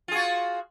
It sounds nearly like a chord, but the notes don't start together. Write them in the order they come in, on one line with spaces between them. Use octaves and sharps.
F4 G#4 F#4